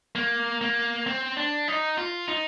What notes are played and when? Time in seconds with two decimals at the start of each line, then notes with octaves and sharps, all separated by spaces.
0.15 A#3
0.61 A#3
1.07 C4
1.37 D4
1.68 D#4
1.98 F4
2.28 D#4